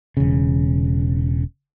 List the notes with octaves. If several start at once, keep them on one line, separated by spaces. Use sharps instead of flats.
E1 C#3